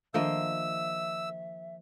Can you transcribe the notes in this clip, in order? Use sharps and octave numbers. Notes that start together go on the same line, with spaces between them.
D#3 F3 A#3 D4 D#5 E5 E6